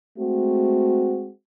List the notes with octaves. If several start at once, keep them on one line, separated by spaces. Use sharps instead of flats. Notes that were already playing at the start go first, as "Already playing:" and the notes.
G#3 A3 C4 F#4